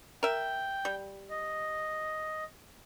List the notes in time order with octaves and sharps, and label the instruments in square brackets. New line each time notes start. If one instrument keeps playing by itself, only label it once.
[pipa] A#4 E5 [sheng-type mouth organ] G5
[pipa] G3
[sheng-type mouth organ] D#5